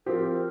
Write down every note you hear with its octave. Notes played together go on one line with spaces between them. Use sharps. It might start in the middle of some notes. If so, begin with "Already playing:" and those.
F3 C4 G4 A#4